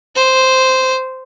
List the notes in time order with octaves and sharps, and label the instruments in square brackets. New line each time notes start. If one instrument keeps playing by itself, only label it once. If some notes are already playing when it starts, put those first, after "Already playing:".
[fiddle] C5